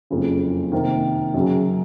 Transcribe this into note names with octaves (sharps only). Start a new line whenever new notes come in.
F#1 F2 C#3
C3 D#3 A#3
F#2 C#3 F#3